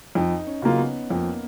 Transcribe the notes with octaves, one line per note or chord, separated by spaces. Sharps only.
F2 D#4
C#4
C#3 F#3 A#3 F4
B3
F2 A#3